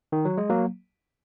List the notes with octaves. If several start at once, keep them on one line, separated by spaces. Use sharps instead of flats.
D#3
F#3
G#3
F#3 A#3